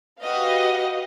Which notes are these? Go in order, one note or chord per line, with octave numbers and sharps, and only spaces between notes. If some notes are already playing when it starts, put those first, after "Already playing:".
F#4 G4 B4 D#5 F5